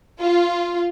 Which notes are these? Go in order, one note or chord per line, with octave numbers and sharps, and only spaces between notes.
F4